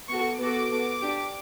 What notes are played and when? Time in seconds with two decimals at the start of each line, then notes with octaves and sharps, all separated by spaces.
0.08 B3 F#4 A4 C#6
0.39 B3 F#4 A4 D6
0.70 B3 F#4 A4
1.01 D4 G4